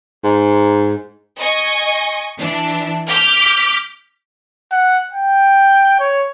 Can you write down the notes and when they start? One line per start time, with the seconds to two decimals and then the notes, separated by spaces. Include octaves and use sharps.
0.23 G#2
1.39 D#5 G#5 C#6
2.38 E3 D4
3.08 D6 F6 G6 B6
4.72 F#5
5.13 G5
6.00 C#5